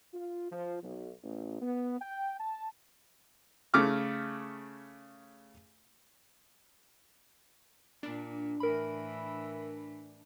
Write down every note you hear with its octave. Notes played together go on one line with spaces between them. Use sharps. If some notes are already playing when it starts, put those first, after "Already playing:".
F4
F3
B1
A1
B3
G5
A5
C#3 A3 D6 F6
A#2 D4
A2 E3 A#4 B5